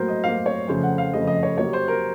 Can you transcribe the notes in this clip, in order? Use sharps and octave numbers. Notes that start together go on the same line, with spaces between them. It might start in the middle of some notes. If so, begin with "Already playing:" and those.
Already playing: A2 F#3 A#3 A#4 C5
D#5
A2 F#3 A#3 F5
C#5
F2 C#3 A3 C5
F#5
F5
F2 C#3 A3 D#5
D#5
C#5
C3 F#3 A#3 C#5
C5
A#4